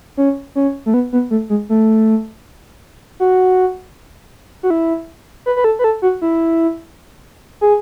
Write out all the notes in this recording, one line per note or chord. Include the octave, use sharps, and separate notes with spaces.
C#4
C#4
A3
B3
B3
A3
G#3
A3
F#4
F#4
E4
B4
B4
A4
B4
A4
F#4
E4
G#4